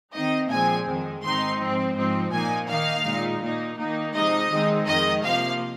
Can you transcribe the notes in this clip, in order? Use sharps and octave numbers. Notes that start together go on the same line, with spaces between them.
D#3 C4 D#4 D#5
A#2 F3 G#3 C4 G#5
F2 D#3 G#3
G#2 D#3 C4 D#4 C6
G#2 F3 C4
G#2 F3 C4 D#4
A#2 A#3 D#4 G#5
D#3 A#3 D#4 F5
A#2 G#3 D#4
A#2 A#3 D#4
D#3 A#3 D#4
C3 F3 G#3 D#4 D#5
D#3 G#3 C4 D#4
F2 D#3 G#3 D#5
C3 F3 A#3 F5